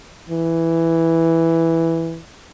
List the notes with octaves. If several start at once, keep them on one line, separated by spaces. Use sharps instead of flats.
E3